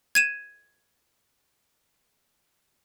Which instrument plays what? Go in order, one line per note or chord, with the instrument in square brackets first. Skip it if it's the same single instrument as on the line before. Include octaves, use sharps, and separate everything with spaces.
[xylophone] G#6 D#7 E7